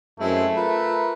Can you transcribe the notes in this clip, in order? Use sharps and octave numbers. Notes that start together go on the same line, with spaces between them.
F#2 G#3 A3 C4 E4
F4 A#4 B4